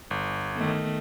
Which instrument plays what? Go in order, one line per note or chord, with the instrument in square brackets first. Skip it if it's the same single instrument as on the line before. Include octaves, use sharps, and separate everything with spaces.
[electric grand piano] G1
[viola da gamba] D#3 A3 B3